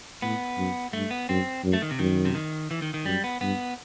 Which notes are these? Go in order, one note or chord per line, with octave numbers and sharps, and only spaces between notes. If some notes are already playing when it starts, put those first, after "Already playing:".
A2 B3
F#2
G2 A3
B3
F#2 C4
F#2
A3
D#3
C3
F#2 D#3
C3
D#3
E3
D#3
D#3
F#2 G3
B3
G2 B3